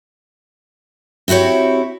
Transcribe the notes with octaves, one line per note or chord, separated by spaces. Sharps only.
C4 E4 F#4 G4 C#5